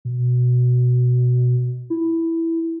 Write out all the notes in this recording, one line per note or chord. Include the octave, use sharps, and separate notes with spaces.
B2
E4